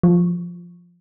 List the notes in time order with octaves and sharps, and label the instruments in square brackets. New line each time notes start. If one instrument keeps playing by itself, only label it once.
[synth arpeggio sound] F3